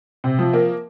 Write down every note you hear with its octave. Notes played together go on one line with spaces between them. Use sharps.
C3
F3
A#3